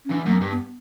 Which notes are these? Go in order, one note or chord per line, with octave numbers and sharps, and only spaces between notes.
C#4
E2 D4
F#2 A3
B3
G2
B3